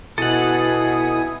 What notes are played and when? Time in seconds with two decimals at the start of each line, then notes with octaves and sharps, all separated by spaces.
0.18 B2 E4 A4 F#5 G#5 D#6